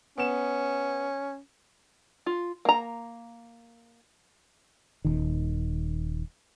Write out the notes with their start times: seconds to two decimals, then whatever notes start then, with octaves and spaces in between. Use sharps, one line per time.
0.18 B3 C#4 E7
2.26 F4
2.65 A#3 A#5
5.05 D#1 D#3